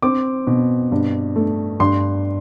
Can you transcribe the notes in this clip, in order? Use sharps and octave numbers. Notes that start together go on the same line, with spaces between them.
C4 D6
B2
G2
A3
G2 C6